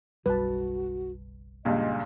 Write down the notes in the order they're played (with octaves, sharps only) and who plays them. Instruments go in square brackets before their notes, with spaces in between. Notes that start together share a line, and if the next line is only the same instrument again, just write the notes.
[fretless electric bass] F#1 B1 G3 [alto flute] F#4 [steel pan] B4 A5
[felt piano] C#2 G2 A#2 [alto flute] D#5